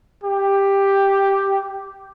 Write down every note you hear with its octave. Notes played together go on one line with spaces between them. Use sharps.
G4